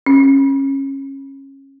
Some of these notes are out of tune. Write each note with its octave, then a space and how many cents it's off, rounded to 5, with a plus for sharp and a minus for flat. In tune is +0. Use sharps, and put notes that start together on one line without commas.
C#4 -25